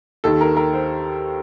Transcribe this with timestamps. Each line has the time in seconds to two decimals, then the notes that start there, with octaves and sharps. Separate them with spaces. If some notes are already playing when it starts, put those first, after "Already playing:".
0.24 D#2 D#3 A4
0.41 A#4
0.57 A#4
0.74 C5